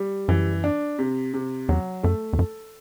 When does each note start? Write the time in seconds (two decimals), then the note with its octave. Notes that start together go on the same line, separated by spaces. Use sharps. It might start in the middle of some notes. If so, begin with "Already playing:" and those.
Already playing: G3
0.28 F#2 E3
0.64 D4
0.99 C3
1.34 C3
1.69 E2 F#3
2.03 F#2 A3
2.33 E2
2.39 F#2 A4